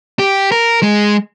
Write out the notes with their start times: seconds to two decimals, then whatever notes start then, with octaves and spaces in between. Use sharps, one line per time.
0.19 G4
0.52 A#4
0.83 G#3